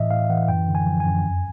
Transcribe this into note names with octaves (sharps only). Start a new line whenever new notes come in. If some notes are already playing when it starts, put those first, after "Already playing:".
Already playing: A2 E3 D#5 E5
A2 F5
E3 F#5
F#2 G5
D3
G#5
F3
G#5
F#2
F2